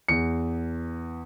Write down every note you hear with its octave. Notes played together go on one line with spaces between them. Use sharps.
E2 C#7